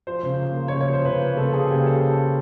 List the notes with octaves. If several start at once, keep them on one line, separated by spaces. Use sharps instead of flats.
F3 C5
C#3
A#3
A#3
C#5
C#3
C#5
F3 C5
C#3 B4
A#3
C#3 A4
A#3 G#4
C#3 G4
A4